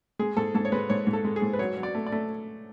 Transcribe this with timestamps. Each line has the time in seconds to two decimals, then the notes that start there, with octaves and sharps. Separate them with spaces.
0.19 G#3 G#4
0.37 G#2 A4
0.55 G#2 A4
0.65 C#5
0.72 G#3 B4
0.90 G#2 C#5
1.07 G#2
1.13 A4
1.25 G#3
1.36 G#4
1.42 G#2
1.53 B4
1.59 F#3 C#5
1.77 F#3
1.83 D5
1.95 A3
2.07 D5
2.12 A3